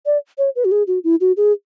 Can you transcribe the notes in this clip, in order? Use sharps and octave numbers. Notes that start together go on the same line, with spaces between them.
D5
C#5
B4
F#4
G#4
F#4
E4
F#4
G#4